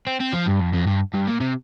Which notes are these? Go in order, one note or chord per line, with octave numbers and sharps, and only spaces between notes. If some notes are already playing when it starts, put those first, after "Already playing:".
C4
C4
F3
G2
F2
F2
G2
G2
A#2
C3